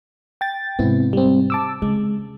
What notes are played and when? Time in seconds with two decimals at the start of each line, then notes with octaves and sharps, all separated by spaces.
0.41 G5 A6
0.79 G#2 C3 B3 C4 E4
1.13 G3 C4
1.50 A5 D6 E6
1.82 C#3 G#3